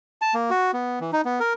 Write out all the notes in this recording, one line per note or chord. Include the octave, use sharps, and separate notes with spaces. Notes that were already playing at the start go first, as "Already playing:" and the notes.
A5
A#3
F#4
B3
E3
D#4
B3
A#4